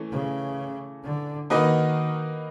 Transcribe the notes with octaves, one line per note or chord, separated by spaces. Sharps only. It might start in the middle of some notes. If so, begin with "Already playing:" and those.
Already playing: E3 A3 C#4
C#3
D3
D#3 A#3 D#4 F#4 B4 D#5